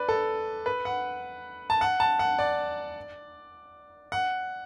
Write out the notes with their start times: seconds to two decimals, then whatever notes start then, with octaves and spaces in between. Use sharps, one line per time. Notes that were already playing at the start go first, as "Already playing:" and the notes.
Already playing: B4 D5
0.09 A4
0.66 B4
0.85 F#5
1.70 A5
1.81 F#5
2.00 A5
2.19 F#5
2.39 D5
4.12 F#5